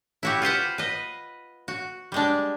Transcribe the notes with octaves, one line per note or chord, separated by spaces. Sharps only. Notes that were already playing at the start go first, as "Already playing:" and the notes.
E4 F#4 G4
F4 B4 C5 F#5
B4 D#5
F#4
G3 G#3 D4